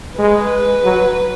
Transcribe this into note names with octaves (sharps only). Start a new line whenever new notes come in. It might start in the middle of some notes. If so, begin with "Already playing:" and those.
G#3 B4
F#3